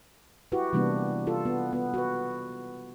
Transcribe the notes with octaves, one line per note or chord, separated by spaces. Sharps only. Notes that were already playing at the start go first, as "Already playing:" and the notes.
E4 F#4 G4 B4
C3 E3 G3 A#3 B3 D4
F4 A4
B3
B3
F#4 B4